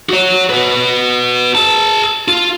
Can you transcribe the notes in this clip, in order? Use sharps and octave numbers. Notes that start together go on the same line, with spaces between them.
F#4 C#5
F#4 B4
G#4 A5
F4